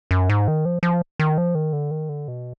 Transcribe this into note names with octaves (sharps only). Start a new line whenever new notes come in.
F#2
G#2
D#3
F3
F3
D#3
F3
D#3
D3
D#3
D3
B2